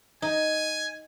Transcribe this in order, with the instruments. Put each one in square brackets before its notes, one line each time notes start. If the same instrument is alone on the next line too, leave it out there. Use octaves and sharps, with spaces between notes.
[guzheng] D#4 [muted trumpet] G#5